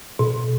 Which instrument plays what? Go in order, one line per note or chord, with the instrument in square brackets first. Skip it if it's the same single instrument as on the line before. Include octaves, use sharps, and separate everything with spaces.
[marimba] B2